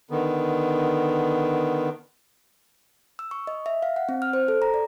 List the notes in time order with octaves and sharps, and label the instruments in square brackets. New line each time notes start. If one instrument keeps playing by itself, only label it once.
[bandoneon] D3 D#3 B3
[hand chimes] E6
C#6
D#5
E5
F5
F#5
C4
F6
C5
A4
A#5
D5